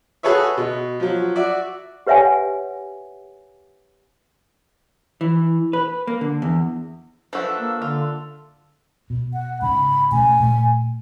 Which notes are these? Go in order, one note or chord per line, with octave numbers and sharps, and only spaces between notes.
F#4 G#4 A4 B4 C#5 E5
B2
F3 F#3
F#4 D5 E5
G4 B4 C#5 E5 F#5 G#5
E3
B4
A#3
D3
E2
F3 D4 F#4 A4 B4 E5
A#3
D3 F4
B2
F#5
G#2 C#3 B5
B2 A3 C#4 G#5
A#2 A3